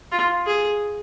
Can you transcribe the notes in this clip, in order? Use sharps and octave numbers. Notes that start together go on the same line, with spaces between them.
F4
G#4